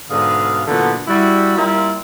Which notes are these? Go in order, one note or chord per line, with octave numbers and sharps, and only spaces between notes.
G#2 B2 D3 G#4 F5
A#2 D3 E3 F#3 A3 B3
G3 E4 F#4
G3 A#3 E4 F4